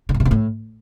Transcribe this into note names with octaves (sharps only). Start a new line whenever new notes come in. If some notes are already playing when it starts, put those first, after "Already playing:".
D3
G2
B2
C3
A2